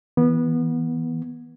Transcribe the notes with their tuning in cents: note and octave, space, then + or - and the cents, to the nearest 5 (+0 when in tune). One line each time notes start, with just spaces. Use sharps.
E3 -20 B3 -20